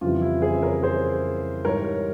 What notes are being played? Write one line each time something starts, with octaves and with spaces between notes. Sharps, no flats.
F2 C#3 E3 G3 F4
E4
G#4 C5
E5
A#4 C#5
G#4 C5
G#2 E3 G3 A#4 C#5